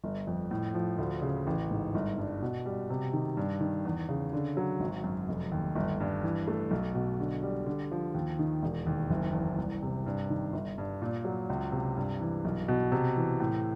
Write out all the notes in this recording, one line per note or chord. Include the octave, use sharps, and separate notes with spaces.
G1
F2
A2
F3
D2
C#3
A1
G#2
G1
G2
B2
G3
C3
D#3
G2
D#3
E2
C#3
D3
F#3
G#1
F#2
F1
D#2
G1
G2
E3
A3
B1
B2
D3
G3
D3
F3
D#2
D#3
E1
D#2
F#1
E2
C2
C3
G2
D#3
G1
G2
A#2
F#3
C#2
C3
G2
E3
B1
B2
C3
E3
A2